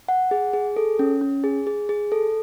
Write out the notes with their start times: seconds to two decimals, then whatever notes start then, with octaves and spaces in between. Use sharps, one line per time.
0.08 F#5
0.31 G#4
0.53 G#4
0.76 A4
0.99 C#4
1.21 C#4
1.44 G#4
1.67 G#4
1.89 G#4
2.12 A4